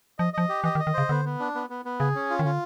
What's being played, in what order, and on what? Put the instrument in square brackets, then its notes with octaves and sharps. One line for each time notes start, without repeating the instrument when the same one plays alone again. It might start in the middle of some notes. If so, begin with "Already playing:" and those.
[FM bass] F3 [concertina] D#5
[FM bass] F3 [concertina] D#5
[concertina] G4
[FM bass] E3 [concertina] D#5
[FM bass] D#3
[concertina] D#5
[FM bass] D#3
[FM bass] C#3 [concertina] C5
[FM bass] D3 [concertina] B3
[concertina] B3
D4
B3
B3
B3
[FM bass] C#3 [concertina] G#4
[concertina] C#4
F4
[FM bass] D#3
[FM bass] D3 [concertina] F4